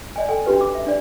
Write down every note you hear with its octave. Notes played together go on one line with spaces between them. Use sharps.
D5 D#5 G#5
A4 G5 G#5
C#4 D4 F#4 G4 B4
D6
E5
D4 D5